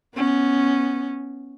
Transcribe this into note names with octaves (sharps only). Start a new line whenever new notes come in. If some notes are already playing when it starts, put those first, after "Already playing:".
B3 C#4